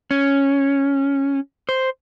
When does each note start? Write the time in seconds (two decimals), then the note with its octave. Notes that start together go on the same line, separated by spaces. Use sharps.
0.11 C#4
1.69 C5